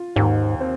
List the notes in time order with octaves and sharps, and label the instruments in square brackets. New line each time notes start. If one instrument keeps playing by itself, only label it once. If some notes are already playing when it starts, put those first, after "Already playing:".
Already playing: [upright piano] F4
[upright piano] D#2 [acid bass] G#2
[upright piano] C4